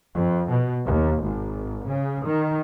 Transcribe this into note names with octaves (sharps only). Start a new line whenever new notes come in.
F2
B2
D#2
G#1
C#3
D#3